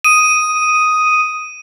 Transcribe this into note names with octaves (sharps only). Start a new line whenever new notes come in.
D#6 D#7